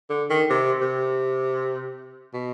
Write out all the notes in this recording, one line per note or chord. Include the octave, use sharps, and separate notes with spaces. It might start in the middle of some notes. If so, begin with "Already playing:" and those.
D3
D#3
C3
C3
B2